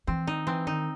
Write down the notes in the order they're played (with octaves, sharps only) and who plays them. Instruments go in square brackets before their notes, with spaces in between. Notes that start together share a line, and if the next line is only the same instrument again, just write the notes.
[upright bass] E3 [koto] C4
[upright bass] D#3 [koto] D#4
[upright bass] E3 [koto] C4
[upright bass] D#3 [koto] D#4